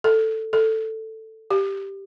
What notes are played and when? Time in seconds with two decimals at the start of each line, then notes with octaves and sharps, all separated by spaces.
0.04 A4
0.53 A4
1.51 G4